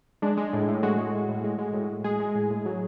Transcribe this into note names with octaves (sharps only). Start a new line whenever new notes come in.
G#3 D4
G#3
A2
A2
G#3 F#4
G#3
A2
A2
G#3
G#3
A2
A2
G#3 G#4
G#3
A2
A2
F#3